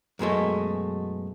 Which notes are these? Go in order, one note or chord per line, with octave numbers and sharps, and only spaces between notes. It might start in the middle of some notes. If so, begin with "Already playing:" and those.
F#2 B2 G#3 A3